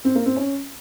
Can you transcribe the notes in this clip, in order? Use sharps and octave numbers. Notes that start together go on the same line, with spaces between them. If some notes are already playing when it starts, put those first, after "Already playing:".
C4
A#3
C4
C#4